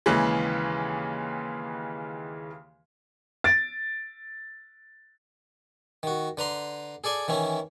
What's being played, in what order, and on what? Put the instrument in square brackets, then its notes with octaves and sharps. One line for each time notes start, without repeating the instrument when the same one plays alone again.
[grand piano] D#2 C#3 E3 G#3
[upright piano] A6 D7
[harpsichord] D#3 F#4
D3 B4 A#5 C6
G#4 A4 D5 G#5
D#3 E3 C#4 E4